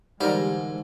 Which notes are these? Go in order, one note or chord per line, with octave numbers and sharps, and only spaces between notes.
G#2 D3 E3 G3 G#3 A#4 C5